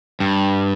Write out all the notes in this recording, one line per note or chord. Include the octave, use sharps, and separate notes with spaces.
G2